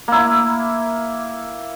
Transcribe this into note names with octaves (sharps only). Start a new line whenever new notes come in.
A#3 E4